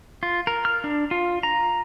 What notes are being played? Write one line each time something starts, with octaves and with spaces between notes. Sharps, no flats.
F4
A#4
F6
D4
F4
A#5